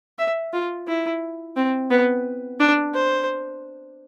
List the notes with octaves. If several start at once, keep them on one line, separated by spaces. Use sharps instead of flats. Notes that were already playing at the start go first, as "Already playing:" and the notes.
E5
F4
E4
C4
B3
D4
C5